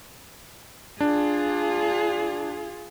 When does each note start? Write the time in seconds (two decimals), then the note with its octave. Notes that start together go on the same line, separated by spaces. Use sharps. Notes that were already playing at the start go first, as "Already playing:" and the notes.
1.00 D4 F4 G#4